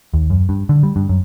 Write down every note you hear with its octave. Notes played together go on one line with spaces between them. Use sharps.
D#2
F#2
G2
D3
G3
G2
F#2